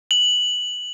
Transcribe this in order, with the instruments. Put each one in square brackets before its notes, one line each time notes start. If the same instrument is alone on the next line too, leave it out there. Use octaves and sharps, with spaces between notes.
[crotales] F#7